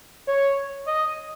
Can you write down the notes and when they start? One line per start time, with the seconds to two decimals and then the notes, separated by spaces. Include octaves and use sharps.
0.28 C#5
0.87 D#5